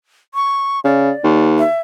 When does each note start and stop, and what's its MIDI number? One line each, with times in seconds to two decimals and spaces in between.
0.34 0.80 85
0.84 1.11 49
0.84 1.44 74
1.24 1.63 39
1.59 1.80 76